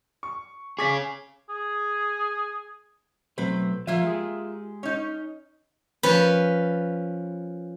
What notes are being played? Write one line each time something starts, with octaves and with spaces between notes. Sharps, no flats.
C#6
C#4 G#4 C#6 D6 B6
G#4
B1 F#3 A3 C4 B4
F3 A#3 F4 E5
G#3 G4 G#4
C#4 D#4
F3 C#4 B4